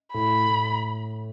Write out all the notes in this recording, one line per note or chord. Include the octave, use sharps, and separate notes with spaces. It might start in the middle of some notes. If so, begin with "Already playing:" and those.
A2 B5
A2